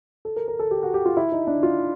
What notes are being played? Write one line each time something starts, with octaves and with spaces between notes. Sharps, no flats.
A4
A#4
A#4
A4
G4
F#4
G4
F4
E4
D#4
D4
F4